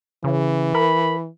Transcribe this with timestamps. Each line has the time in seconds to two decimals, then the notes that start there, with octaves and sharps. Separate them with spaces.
0.24 C#3 E3
0.74 A#4 B5